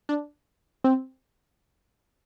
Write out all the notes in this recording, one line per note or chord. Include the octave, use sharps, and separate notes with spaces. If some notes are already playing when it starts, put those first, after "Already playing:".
D4
C4